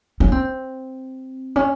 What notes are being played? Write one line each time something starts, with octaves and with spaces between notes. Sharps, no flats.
C#4
C4
C#4